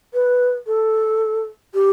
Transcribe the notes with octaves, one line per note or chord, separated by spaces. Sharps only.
B4
A4
G4